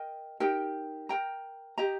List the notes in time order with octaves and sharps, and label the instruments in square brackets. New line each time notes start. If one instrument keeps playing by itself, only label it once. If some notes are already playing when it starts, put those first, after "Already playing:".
Already playing: [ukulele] A#4 D#5 G5
D#4 G4 A#4 G5
A#4 G5 A#5
G4 D#5 G5 A#5